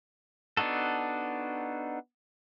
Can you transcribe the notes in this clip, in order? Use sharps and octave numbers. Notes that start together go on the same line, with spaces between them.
B3 D4 D#4 F#4 A4